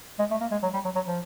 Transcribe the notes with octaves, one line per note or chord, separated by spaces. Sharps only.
G#3
A3
A#3
G#3
F#3
G3
F#3
F#3
F3